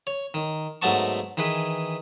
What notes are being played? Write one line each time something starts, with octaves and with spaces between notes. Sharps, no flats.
C#5
D#3
G#2 F#3 A3 B3 A5 C#6
D#3 E3 G#4 B4